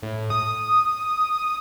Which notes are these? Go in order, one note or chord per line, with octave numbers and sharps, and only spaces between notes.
A2
D#6